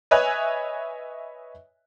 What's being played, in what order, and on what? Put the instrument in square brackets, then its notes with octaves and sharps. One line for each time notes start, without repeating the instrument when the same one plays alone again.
[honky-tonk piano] B4 C#5 D#5 E5 G#5 F#6